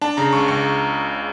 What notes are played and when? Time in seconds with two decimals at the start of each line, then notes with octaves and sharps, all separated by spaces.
0.01 D4 A5
0.17 C#3 A#5
0.33 C#2 C#6
0.48 C#2 C#6